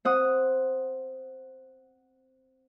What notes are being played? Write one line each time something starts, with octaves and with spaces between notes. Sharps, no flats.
C4 F#5 D#6